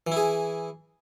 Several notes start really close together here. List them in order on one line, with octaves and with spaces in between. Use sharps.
E3 E4 G#4